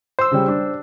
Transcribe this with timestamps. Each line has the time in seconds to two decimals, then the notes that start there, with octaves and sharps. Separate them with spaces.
0.19 C5 C6 E6
0.32 C#3 G3
0.48 D4